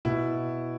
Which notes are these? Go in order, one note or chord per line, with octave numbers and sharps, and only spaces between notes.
B2 E4